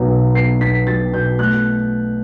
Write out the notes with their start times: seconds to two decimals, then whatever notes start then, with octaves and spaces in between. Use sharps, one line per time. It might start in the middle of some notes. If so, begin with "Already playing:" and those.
Already playing: B1 F#3 B3
0.09 B2
0.35 B3 C7
0.61 B1 B6
0.87 F#3 A6
1.13 B2 G6
1.39 A3 F#6